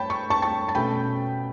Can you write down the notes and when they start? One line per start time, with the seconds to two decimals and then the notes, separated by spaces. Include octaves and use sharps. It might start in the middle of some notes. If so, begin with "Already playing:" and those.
Already playing: G2 A3 C#5 G5 A5 B5
0.10 C#6
0.30 A5 C#6
0.42 A5 C#6
0.69 A5
0.75 B2 A3 C#4 G5 B5